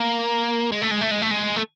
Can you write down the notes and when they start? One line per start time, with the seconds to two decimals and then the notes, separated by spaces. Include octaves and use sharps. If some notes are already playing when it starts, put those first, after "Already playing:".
Already playing: A#3
0.72 G#3
0.82 A3
0.91 G#3
1.01 A3
1.11 G#3
1.22 A3
1.31 G#3
1.56 A3